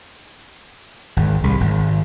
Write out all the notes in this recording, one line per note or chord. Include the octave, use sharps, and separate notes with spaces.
G#1
C2
G#1